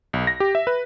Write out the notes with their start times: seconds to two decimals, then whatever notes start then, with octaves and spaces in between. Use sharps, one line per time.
0.13 B1
0.27 A#6
0.40 G4
0.55 E5
0.67 B4